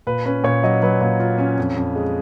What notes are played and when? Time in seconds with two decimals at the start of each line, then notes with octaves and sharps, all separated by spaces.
0.07 A#2 B4
0.25 C#4 B4
0.44 A#2 C#5
0.63 F#3 D#5
0.82 F#3 B4
1.01 A#2
1.19 F4
1.38 C#4
1.58 F2
1.76 F2
1.96 G#3